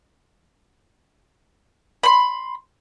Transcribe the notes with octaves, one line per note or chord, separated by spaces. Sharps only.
B5 C6